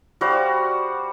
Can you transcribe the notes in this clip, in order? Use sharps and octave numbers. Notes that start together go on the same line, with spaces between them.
G3 F#4 C5 F5